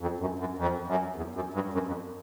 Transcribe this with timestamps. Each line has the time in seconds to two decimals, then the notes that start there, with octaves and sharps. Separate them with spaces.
0.01 F2
0.20 F#2
0.39 F#2
0.58 F2
0.87 F#2
1.16 E2
1.35 F#2
1.54 G2
1.73 F#2
1.87 F2